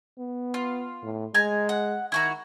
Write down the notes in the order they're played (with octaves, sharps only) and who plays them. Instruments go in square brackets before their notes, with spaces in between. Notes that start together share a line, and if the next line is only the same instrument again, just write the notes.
[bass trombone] B3
[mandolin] F4
[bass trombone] A2
[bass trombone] G#3 [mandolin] G#5 A#5
[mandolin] F#5
[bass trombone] D#3 [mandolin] E4 F#4 A#5